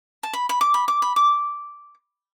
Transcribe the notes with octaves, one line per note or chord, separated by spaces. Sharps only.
A5
B5
B5
D6
B5
D6
B5
D6